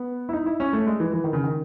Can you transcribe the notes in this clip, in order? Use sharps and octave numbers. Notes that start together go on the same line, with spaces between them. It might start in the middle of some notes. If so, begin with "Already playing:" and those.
Already playing: B3
E4
D#4
E4
C#4
A3
G#3
E3
E3
D#3
C#3
D#3